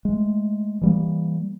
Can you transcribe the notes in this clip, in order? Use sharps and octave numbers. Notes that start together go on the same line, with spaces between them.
G#3 A3
E3 G3 A#3